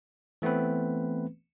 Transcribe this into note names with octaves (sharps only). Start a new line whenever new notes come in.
E3 A3 B3 C4 B4